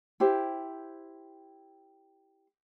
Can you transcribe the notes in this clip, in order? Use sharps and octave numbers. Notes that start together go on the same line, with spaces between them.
E4 G4 C5